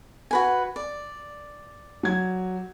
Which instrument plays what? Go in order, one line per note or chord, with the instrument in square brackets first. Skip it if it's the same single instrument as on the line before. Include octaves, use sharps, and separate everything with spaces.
[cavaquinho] F#4 B4 G#5
D5
[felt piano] F#3 G#6